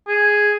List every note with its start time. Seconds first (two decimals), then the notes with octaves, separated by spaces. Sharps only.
0.08 G#4